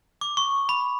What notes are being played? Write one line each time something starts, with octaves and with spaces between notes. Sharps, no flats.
D6
C#6
B5